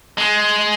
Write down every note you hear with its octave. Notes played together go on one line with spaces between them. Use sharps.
G#3